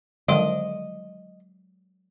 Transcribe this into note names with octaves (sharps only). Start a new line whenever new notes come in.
D3 D#3 F3 F#3 G#3 D#5 C6